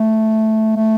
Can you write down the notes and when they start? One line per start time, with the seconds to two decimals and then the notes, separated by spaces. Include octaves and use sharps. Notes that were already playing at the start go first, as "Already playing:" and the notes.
Already playing: A3
0.76 A3